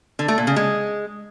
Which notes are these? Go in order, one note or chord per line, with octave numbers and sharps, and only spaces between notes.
D3
A3
A#2
C#3
G#3